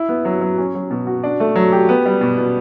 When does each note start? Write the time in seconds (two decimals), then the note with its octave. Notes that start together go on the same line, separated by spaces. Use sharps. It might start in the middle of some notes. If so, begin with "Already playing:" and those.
Already playing: E4
0.09 B3
0.25 F#3
0.41 F#3
0.58 C#4
0.75 F#3
0.90 B2
1.07 F#4
1.24 D4
1.40 A3
1.56 F#3
1.72 G4
1.89 B3
2.06 G3
2.21 B2
2.38 B2